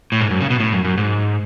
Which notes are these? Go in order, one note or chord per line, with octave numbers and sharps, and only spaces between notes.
A2
G#2
F#2
C#3
B2
A2
F#2
F#2
G#2